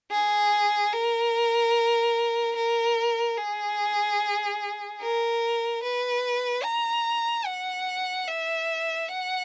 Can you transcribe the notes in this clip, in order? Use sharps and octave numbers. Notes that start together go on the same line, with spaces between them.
G#4
A#4
A#4
G#4
A#4
B4
A#5
F#5
E5
F#5